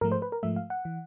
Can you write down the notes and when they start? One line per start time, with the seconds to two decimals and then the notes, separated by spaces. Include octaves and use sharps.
0.01 G#2 F3 A3 A#4
0.12 C5
0.22 B4
0.32 A#4
0.43 G#2 F3 A3 E5
0.56 F5
0.70 F#5
0.85 E3